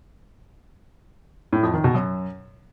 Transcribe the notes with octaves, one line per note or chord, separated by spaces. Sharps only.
A2
F2
D#3
B2
F#2